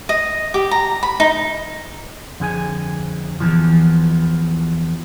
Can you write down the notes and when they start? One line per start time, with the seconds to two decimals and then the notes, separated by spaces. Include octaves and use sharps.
0.09 D#5
0.54 G4
0.71 A#5
1.03 B5
1.20 D#4
2.40 F2 D3 G#4 G#5
3.40 E2 B2 E3 F3